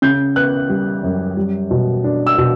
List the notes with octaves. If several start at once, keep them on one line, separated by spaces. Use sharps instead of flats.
C#3 G6
B3 F#6
G3
F#2
G3
B2
D4
E6
B2